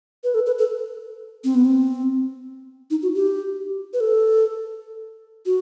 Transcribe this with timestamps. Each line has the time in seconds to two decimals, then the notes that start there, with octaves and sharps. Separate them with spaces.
0.24 B4
0.34 A4
0.46 B4
0.58 A4
1.44 C4
1.55 B3
1.65 C4
2.91 D#4
3.03 F#4
3.15 G4
3.93 B4
4.00 A4
5.46 F#4